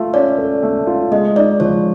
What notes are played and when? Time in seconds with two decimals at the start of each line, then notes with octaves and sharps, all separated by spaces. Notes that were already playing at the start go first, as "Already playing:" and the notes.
Already playing: A3 F4
0.14 C#4 D5
0.38 A4
0.63 A3
0.87 F4
1.12 G#3 D#5
1.36 D#4 D5
1.60 F3 C#5